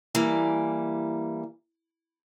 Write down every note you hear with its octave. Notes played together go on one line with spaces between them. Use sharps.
E3 G3 A#3